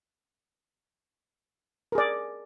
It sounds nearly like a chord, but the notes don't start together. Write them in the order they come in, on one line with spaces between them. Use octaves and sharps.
A#4 G#4 D5